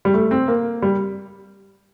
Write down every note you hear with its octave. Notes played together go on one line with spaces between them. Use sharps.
G3
A3
C4
A#3
G3